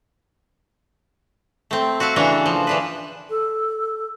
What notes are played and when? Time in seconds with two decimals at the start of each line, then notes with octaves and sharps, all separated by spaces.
1.71 A3 C4
2.00 F#4 E5 F5 A5
2.16 C#3 E3 D4 F#4
2.46 F3
2.67 E3 D4 B4
3.30 A4